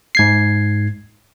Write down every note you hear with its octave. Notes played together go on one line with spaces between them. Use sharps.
G#2 G#6 C7